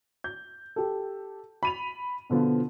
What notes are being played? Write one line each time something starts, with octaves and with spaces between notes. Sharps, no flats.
G6
G4 A4
B5 D#7 F7
B2 D3 F3 B3 F4